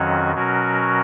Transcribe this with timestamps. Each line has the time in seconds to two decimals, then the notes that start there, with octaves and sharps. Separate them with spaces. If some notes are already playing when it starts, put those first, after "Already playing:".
Already playing: F2 D#3 F#3 C#4 F#4
0.34 B2 F#3 C#4 F#4 A#4